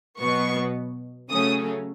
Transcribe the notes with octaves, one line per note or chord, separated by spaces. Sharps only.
B2 F#3 B3 C#6
C#3 F#3 A3 C#4 D#6